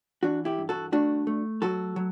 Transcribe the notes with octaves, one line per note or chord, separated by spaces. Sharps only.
E3 D4 F#4
E4 G4
G2
F#4 A4
A3 D4 F#4
A3
F#3 F#4 A4
F#3